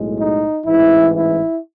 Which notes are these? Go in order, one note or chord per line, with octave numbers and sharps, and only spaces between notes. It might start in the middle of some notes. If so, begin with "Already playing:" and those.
Already playing: B1 A2 G#3
D#4
A1 G#2 E3 E4
E4